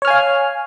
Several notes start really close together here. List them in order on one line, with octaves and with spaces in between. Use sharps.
C#5 F6 G#5 F5